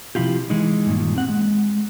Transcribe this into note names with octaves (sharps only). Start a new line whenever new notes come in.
C3 F3 E4 F4 G4
E3 G#3 D#4
G2 A#2 D#3
C4 F#5
G#3